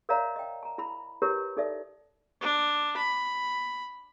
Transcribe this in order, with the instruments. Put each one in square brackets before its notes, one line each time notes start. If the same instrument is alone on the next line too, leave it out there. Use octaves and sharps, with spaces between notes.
[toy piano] A#4 C#5 D5 E5 F5 A#5
D#5 G5
A5 A#5
E4 B5
E4 G4 A#4 B4 C#5
D#4 A4 D5 E5
[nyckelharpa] D4
B5